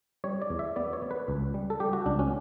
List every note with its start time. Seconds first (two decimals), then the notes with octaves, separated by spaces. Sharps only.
0.24 G3 C#5
0.42 D5
0.50 E2
0.59 E5
0.76 B3 D5
0.93 C#5
1.02 B3
1.11 B4
1.28 C#2
1.54 G3
1.70 A4
1.80 G3 G4
1.93 F#4
2.06 C#2 D4
2.19 C#4